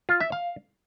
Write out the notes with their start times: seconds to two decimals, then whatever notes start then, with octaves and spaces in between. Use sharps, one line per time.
0.09 F4
0.21 E5
0.32 F5